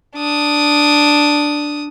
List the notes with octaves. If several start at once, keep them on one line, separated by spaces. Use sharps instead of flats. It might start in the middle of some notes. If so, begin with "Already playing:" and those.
D4 D#6